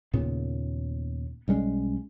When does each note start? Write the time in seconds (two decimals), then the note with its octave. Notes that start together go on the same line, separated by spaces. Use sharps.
0.13 D#2 A#2 C#3 B3
1.48 B1 G3 G#3 C#4